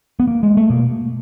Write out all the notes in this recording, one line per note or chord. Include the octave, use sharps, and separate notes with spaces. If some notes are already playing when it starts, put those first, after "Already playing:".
B3
A#3
G#3
A3
B2 A#3